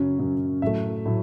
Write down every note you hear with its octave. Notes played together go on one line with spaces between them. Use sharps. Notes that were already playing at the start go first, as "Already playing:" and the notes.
Already playing: F#2 C#3 F#3 C#4
F#2 C#3 F#3 C#4
A2 F#3 A3 E5
A2 F#3